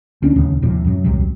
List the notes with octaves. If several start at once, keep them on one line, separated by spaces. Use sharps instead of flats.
D2 C#4 D4
D1 D#2 A2 C#3
D#1 F2 A2 C3
F#2 F#3
D#1 C2 C3 F#3